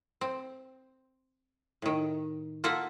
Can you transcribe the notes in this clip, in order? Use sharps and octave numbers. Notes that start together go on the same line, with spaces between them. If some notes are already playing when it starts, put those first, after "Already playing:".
C4
A2 D#3
A#3 F4 A4 E5 F#5